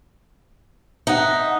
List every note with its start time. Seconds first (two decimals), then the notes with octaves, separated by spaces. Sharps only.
1.07 D#4 E5 F#5